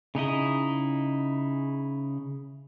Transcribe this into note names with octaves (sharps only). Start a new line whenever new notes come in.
C#3 D#4 E4 D#5